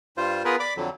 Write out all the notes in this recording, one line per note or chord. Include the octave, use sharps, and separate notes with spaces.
G2 G3 F4 C5
B3 F4 G#4 A#4 B4
D5 B5 D6
F2 D3 F#3